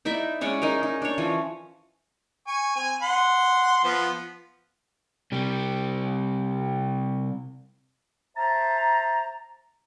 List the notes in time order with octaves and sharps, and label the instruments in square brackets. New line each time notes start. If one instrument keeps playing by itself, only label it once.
[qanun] D#4 E4 D5 E5
G#3 C#4 D5 F#5
D#4 G#4 A#4
D#4
D4 C#5
E3 F3 C#4
[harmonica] G#5 C#6
C4 G#5
F#5 C6
F3 B3 C5
[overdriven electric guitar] C3 G3
[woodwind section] C5 E5 A5 A#5